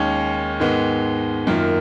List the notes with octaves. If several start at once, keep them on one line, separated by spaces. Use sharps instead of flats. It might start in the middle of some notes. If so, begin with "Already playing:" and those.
Already playing: D#2 D#3 G#3 C#4
G#2 D#3 G#3 B3
F#2 D#3 A#3 F4